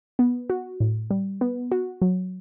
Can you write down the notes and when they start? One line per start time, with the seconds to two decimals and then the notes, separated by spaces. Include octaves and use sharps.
0.19 B3
0.50 F#4
0.80 A2
1.10 G3
1.41 B3
1.72 F#4
2.02 F#3